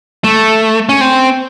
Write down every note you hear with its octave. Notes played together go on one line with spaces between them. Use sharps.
A3
C#4
C4